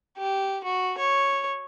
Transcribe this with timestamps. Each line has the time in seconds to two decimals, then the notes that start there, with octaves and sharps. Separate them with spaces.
0.18 G4
0.64 F#4
0.98 C#5